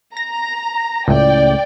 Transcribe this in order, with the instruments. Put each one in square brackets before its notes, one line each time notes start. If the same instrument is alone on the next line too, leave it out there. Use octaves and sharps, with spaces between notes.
[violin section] A#5 [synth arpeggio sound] A#6
[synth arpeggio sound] C#2 A2 [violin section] D5 G5